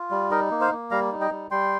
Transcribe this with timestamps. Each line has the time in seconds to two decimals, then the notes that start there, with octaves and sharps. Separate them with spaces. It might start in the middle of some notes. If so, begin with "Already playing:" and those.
Already playing: F4
0.11 G3
0.31 D#4 A#4 D#5
0.51 A#3
0.60 C5 F5
0.72 A#3
0.91 G3 F5 A#5
1.12 D#4
1.21 D#5 G5
1.31 G3
1.51 G3 G5 C6